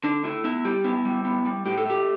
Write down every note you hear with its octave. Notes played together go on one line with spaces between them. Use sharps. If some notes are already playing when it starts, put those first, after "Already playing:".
D3 D4
A3 E4
B3 E4
G3 G4
B3 E4
G3
B3
G3
A2 G4
A4
A3 G4